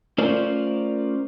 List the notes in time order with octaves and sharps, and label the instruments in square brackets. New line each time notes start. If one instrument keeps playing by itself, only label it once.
[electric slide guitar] A3 C#4 F4 A#4 C5 D5